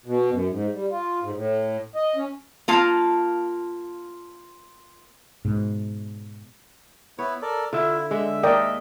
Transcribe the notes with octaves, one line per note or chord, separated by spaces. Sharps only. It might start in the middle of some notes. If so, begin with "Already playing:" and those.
B2
F#2
G#2
G3
F4
G#2
A2
D#5
C#4
A#3 F4 A5
G#2 B2
B3 E4 B4 C#5
A4 A#4 D5
D3 E4 F4 E5
D3 G#3 E5
A#3 A#4 D5 D#5 G5